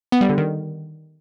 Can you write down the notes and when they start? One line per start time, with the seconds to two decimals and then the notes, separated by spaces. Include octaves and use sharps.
0.12 B3
0.21 G3
0.29 D3
0.38 D#3